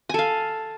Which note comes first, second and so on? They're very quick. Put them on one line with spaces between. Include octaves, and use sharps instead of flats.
G#5 A4 F5